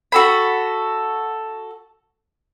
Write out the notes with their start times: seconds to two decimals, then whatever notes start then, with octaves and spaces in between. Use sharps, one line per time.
0.12 F#4 A4 B5